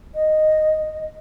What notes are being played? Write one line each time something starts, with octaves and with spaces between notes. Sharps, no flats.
D#5